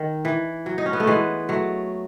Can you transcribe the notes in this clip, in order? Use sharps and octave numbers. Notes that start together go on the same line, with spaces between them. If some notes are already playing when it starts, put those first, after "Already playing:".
Already playing: D#3
E3
F#3
D#4
C#4
B3
A3
E3 G#3
F#3 A3